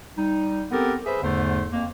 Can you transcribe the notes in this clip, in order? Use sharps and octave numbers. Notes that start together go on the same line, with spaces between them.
G3 D#4
B3 C4 G4 A4 A#4
G#4 B4 C5 E5
E2 G#2 D3 A3 C5
F2 A#3